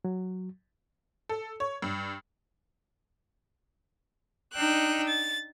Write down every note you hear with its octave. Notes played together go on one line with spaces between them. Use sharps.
F#3
A4
C#5
G2
D4 D#4 G5 E6 F#6
A6